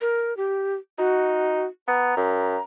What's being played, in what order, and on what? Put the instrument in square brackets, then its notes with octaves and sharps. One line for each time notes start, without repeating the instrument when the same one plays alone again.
[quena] A#4
G4
[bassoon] D#4 [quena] F#4
[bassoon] B3 [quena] A#5
[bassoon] F#2